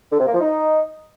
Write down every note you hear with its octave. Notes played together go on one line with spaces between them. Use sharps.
D3
C3
A#3
F3
D#4